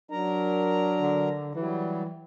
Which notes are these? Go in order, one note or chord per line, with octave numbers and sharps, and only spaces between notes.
F#3 D4 A#4 A#5
D3
E3 F#3 G3